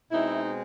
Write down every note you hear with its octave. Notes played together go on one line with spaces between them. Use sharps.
B2 G#3 C4 D#4 E4